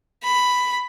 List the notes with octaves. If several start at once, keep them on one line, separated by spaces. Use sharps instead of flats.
B5